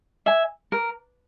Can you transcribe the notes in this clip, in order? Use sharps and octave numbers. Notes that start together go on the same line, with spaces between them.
E5 G#5
A#4